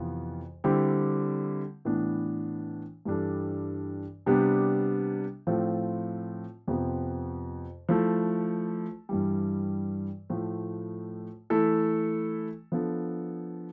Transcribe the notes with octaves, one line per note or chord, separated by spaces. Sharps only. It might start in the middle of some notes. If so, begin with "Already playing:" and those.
Already playing: F2 C3 E3 B3 F4
D3 G3 C4 E4 G4
A2 E3 B3 D4
G2 E3 G3 D4 A4
C3 G3 B3 D4 G4
A2 F3 C4 F4 A4
F2 C3 F3 B3
F3 A3 E4 A4
G2 E3 G3
A2 F3 A3
E3 A3 E4 A4
F3 B3 D4 A4